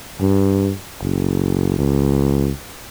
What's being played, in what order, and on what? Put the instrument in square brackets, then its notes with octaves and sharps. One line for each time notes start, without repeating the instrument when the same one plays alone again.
[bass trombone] G2
F#1
C#2